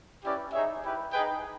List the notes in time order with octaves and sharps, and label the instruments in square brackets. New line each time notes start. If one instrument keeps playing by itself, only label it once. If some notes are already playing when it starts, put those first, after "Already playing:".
[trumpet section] C#4 E4 G4 B4 D5
D#4 G#4 C#5 E5
E4 G4 B4
D#4 G#4 B4 D#5 G5